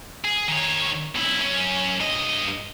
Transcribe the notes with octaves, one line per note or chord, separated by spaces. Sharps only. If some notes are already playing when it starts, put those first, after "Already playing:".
G#4
D#3 C#5
B1 E4
F#2 C#4
G2 D#5